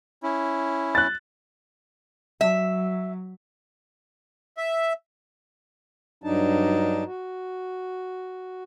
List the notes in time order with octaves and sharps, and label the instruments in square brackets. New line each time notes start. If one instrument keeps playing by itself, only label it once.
[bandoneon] C#4 E4
[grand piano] F#6 A6
[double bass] F#3 [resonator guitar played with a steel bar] E5
[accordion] E5
[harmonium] G2 F#3 D4 D#4 A5
F#4